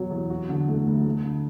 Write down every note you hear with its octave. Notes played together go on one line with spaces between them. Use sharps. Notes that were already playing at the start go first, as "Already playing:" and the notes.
Already playing: E2 B2 F#3
E2
F#4
D3
A3
D2
A3
D3